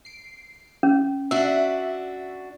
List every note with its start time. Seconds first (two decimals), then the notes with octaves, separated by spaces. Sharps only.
0.05 C7 D7
0.83 C#4
1.31 D4 F#4 E5